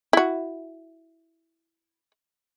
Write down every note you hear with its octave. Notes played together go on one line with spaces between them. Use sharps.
E4 F#4